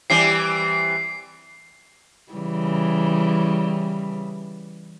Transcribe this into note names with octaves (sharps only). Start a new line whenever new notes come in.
E3 G3 C4 C7
C#3 E3 G3